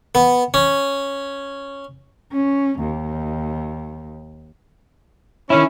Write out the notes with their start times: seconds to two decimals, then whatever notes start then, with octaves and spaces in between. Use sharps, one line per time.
0.15 B3
0.54 C#4
2.32 C#4
2.80 D#2
5.50 D#3 C#4 E4